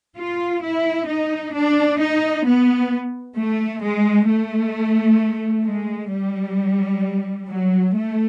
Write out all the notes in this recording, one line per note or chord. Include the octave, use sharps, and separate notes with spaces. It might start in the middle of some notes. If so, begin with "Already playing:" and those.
F4
E4
D#4
D4
D#4
B3
A3
G#3
A3
G#3
G3
F#3
A3